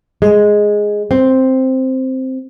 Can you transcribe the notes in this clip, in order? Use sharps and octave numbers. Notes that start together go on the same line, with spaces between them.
G#3
C4